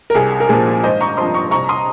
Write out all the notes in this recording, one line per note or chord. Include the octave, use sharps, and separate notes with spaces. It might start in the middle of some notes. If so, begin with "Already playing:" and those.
A#4
C2 G#4
A#4
A#2 F3 G#4
G#1 C5 D#5
A#5 C#6
G2 F3 C4 C6 D#6
A#5 C#6
C2 A#5 C#6
C6 D#6